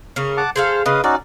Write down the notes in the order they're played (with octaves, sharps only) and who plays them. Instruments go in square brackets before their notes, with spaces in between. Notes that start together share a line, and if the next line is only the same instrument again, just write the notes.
[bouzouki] C#3 C#4 A#4
[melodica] F#5 A5 D6
[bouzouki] G#4 A4 F5 [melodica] C5
[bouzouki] C#3 [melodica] B4 D#5 F5
[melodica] C#4 D#4 F#4 [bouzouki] D5